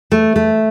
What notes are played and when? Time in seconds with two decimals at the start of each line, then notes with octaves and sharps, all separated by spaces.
0.12 A3
0.36 A3